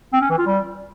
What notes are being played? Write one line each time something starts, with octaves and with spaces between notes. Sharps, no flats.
C4
C#4
E3
F4
G3